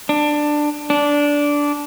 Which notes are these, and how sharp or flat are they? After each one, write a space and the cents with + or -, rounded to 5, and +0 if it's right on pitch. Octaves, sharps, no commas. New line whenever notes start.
D4 +15
D4 -10